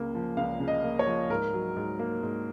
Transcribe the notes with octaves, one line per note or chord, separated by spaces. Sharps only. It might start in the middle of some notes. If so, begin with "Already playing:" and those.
Already playing: C#2 C#3 A#3
F3
C#2 F5
C#3
D#5
A#3
C#5
F3
G#2 A#4
F#3
G#2
A#3
G#2